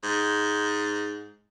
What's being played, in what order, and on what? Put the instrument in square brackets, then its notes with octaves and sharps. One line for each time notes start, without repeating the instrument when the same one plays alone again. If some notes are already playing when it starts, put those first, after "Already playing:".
[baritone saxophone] G#2